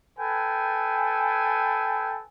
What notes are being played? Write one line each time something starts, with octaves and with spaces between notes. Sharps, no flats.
A4 B4 G5 G#5